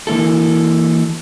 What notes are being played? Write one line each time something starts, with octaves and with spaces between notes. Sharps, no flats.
E3 A#3 E4 A4